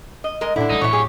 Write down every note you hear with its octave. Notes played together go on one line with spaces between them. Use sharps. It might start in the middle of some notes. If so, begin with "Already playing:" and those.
D#5
G#3 A#4 D#5
A2 D3 D4 E4
F3 A3 D#4
F#2 A2 E3 E4 C#5
G4 G#4